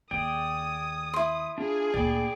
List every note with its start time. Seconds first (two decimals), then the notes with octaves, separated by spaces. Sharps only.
0.11 D#2 G#4 D5 G5 D#6
1.14 E4 C6
1.58 D4 F4 G#4
1.94 D2 A#2 D5 G5 B5